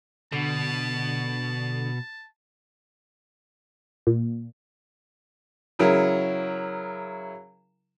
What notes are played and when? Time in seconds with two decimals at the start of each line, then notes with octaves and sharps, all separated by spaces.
0.32 B2 D3 A5
4.07 A#2
5.79 C#3 F#3 E4 A#4